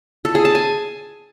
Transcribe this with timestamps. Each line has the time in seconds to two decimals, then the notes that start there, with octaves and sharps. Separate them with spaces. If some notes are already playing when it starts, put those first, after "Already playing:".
0.25 A4
0.35 G#4
0.45 A5
0.55 G#5